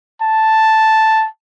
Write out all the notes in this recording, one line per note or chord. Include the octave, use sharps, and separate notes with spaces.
A5